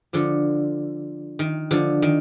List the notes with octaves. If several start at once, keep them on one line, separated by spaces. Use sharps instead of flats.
D3 F3
D#3
D3 F3
D#3